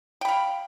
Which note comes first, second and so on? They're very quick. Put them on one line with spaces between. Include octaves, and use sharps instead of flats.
G5 B5 F5